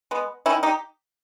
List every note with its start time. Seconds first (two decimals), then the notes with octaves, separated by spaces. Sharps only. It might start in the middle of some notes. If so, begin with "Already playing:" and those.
0.11 G#3 B3
0.46 D#3 C#4 E4
0.63 D#4 G4